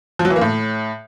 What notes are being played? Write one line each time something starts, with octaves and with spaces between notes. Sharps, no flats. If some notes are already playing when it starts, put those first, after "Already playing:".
F3
F#3
E3
A#3
A2